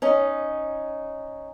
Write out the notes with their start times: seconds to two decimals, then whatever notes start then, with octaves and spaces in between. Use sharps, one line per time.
0.02 C#4 D#4